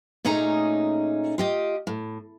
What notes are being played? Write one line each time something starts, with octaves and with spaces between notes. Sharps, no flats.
A#2 A3 C#4 D#4 G#4 A#5
F4 G4 D#5
A2